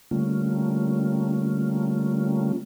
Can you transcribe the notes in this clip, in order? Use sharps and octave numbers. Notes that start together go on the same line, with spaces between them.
D3 G3 A3 A#3 C#4 F4